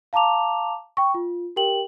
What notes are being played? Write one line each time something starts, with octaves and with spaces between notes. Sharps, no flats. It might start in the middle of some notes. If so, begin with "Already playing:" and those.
F5 A5 A#5 D6 F7
G5 C#6
F4
G4 A#4 G5 F#7